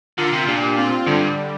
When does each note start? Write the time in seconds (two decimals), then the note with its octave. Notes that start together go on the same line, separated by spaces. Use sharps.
0.17 D3 F4 A#4
0.33 C3
0.47 A#2 D4 G4
0.78 C4 F4
1.06 G2 D3 G3